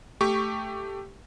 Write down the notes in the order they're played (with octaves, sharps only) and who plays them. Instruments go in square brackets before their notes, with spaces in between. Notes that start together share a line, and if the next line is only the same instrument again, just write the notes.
[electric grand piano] A3 G4 C#6